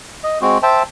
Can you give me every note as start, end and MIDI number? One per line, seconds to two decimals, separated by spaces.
0.24 0.39 75
0.42 0.58 56
0.42 0.58 60
0.42 0.58 66
0.63 0.83 72
0.63 0.83 76
0.63 0.83 79
0.63 0.83 81